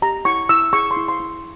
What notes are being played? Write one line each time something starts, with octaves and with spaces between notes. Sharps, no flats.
G4 A#5
E4 C#6
E4 E6
G#4 C#6
C6
E4
C6
E4